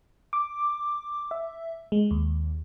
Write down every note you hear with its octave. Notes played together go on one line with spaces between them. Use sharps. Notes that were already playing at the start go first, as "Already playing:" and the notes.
D6
E5
G#3
D#2